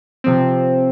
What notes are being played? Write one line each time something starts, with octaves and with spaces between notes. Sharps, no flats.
C3 F3 C4